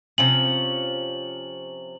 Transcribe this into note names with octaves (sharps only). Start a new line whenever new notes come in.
C3 F3 C#4 F#7